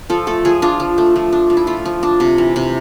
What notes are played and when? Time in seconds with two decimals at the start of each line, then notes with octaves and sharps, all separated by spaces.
0.10 F3 A4
0.27 A3 A4
0.45 F3 G#4
0.62 D4 F4
0.80 F3
0.98 A3
1.16 F3
1.33 D4
1.50 F3
1.57 E4
1.67 A3 F4
1.85 F3
2.03 D4
2.20 C3
2.38 E3
2.56 C3